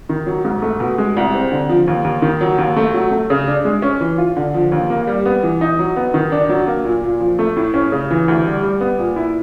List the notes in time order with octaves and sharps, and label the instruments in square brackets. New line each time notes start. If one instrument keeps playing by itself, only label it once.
[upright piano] D#3
F#3
G#2
A3
B2
G#3
C2
C4
D3
F3
D#2
D#2
D#3
F#3
D#2
A3
F#3
A3
C#3
D4
G#3
C#4
E3
F4
D3
F3
D#2
A#3
G3
B3
E3
D#4
F#3
B3
D#3
D4
F#3
A#3
A#2
A#2
F3
A3
A2
C#4
C#3
E3
D2
G3
G3
B3
A#2
E4